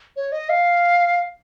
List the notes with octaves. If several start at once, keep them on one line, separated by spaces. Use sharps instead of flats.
C#5
D#5
F5